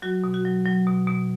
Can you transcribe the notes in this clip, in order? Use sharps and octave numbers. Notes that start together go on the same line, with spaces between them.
F#3 F#4
B2
F#4
F#3
F#3
B2
B2